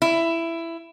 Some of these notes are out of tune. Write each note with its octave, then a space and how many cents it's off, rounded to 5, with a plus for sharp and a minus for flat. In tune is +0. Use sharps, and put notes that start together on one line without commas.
E4 +15